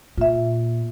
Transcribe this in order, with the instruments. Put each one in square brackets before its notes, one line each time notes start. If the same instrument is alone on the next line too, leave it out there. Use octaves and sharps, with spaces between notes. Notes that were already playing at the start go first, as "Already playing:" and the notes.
[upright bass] A#2 [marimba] F4 E5